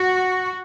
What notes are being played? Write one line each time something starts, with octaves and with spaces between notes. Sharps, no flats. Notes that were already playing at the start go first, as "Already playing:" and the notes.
Already playing: F#4